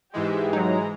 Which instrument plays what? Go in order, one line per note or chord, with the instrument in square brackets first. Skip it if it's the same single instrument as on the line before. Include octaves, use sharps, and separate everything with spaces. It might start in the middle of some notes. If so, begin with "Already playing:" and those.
[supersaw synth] G#2 E3 G#3 [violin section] G4 E5
[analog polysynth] F#3 D#4 [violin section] A#5